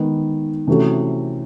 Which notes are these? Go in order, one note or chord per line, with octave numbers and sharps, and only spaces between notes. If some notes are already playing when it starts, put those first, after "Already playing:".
Already playing: D#3 G#3 B3
C3 E3 A3 C#4 F#4